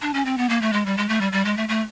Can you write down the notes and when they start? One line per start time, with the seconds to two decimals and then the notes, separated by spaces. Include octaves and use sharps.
0.02 D4
0.14 C#4
0.25 C4
0.37 B3
0.49 A#3
0.61 A3
0.73 G#3
0.86 G3
0.97 G#3
1.08 A3
1.21 G3
1.32 G3
1.45 G#3
1.57 A3
1.68 A3